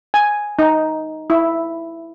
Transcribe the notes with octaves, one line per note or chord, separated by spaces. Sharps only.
G#5
D#4
E4